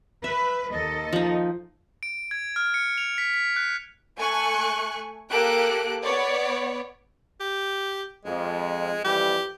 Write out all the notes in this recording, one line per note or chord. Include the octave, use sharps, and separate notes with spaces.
B4 E5
D#2 A4 D#5
F3 D#4
D7
G#6
F6
C#7
F7
B6
B6
F#6
A3 G#5 C#6 F#6
A#3 G4 A4 F#6 D7
B3 C#5 D5
G4
F2 G#3
F2 E3 G3 G4